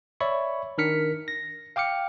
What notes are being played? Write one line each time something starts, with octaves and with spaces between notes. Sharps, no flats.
C#5 D5 E5 B5 C#6
D#3 D4 A#4 F6 B6 C#7
A#6
F5 G5 D6 F6 C#7